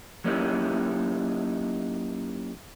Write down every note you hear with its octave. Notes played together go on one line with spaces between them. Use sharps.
F#3 A#3 C#4 D#4 E4 G4